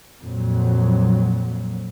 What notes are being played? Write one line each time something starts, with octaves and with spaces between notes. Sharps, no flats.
F2 A#2 F#3